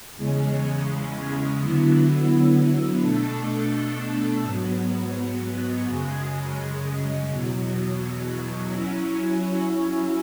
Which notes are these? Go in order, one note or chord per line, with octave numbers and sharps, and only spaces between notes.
E2 C#3 G#3 C#4
D3 F#3 B3 E4
B2 A3 D4 A4
G#2 F#3 B3
F#2 C#3 G#3
E2 B2 F#3
F#3 C#4 E4